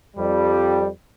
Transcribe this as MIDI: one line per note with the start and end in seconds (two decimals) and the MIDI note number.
0.17 0.87 41
0.17 0.87 55